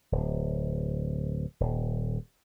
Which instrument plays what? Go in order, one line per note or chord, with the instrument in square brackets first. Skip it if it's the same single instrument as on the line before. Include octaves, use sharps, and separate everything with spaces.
[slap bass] D1
D#1